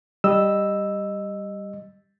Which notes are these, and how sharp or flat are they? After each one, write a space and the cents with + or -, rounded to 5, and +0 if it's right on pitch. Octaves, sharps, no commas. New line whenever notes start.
G3 +0 D#5 -10 E6 +0